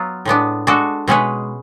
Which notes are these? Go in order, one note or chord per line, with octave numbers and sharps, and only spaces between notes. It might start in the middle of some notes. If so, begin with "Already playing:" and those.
Already playing: F#3 B3 F4
A2 G#3 B3 D4
G#3 D4 F#4 A4
B2 G#3 C#4 G#4 B4